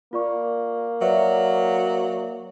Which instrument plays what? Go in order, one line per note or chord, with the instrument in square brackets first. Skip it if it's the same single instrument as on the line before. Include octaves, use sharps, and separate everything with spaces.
[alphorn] A#3 [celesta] F4 D5 C#6
[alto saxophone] F#3 [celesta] B4 D5 E5